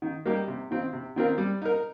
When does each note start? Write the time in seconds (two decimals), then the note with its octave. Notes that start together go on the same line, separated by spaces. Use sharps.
0.02 D#3
0.26 G3 A#3 D#4 G4
0.48 C3
0.71 D#3 C4 F4
0.93 C3
1.16 D#3 C4 F4 A#4
1.38 G3
1.62 D#4 A#4